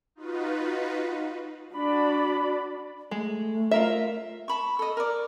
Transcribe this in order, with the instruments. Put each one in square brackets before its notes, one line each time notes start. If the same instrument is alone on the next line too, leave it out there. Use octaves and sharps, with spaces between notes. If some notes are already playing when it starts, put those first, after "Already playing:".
[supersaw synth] D#4 F4 F#4 B4
[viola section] D4 F#4 D5 B5
[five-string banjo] G#3 [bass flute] A3
[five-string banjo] F4 A#4 E5
[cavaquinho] A5 B5 C#6
A4 D#5
A#4 D5